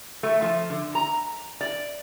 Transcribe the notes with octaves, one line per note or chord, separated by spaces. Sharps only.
A3
F3
D3
A#5
D5